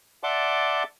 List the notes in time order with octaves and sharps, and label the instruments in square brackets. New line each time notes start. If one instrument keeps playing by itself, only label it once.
[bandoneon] D5 E5 F#5 A5 C6 D6